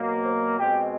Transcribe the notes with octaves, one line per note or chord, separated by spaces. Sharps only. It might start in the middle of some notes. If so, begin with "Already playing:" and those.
Already playing: B2 F#3 A#3
C5
B2 G#3 C4 G4